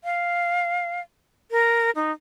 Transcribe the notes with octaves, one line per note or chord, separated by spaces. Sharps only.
F5
A#4
D#4